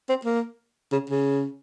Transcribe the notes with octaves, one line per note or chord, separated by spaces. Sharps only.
C4
A#3
C#3
C#3